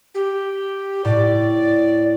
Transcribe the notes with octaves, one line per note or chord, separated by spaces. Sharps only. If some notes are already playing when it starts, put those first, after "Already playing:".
G4
A2 D5